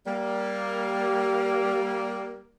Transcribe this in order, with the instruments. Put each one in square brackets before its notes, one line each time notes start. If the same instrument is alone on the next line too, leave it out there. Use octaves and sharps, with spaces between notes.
[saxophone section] G3 A#3